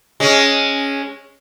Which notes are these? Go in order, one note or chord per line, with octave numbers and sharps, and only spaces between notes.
G#3 C#4